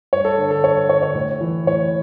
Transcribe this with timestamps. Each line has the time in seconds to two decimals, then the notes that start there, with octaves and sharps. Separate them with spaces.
0.13 G2 C#5
0.25 A4
0.38 D3
0.51 A4
0.64 G2 C#5
0.89 D3 C#5
1.03 C#5
1.15 A2
1.41 E3
1.67 A2 C#5